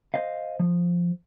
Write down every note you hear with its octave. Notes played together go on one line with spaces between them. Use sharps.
C5 D#5 F5
F3